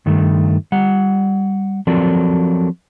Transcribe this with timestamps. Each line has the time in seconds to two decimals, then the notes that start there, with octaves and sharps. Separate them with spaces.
0.06 G2 D#3 A3
0.72 G3 F#5
1.87 F3 F#3 C4 A4 A#4 D5